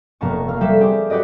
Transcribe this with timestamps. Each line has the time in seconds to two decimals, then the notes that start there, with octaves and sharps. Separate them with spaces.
0.21 F1 A#3 B3 A5 C#6
0.48 A#3 F5 F6
0.61 G3 A4 B4 E5
0.81 C4 G4 G#4
1.10 F#4 G4 B4 D5 D#5